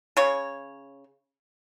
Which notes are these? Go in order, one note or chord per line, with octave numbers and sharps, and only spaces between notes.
C#3 C#5